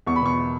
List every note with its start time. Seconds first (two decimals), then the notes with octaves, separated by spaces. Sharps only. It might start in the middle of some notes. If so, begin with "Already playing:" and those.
0.07 E2 C#6
0.16 B5
0.22 B2 C#6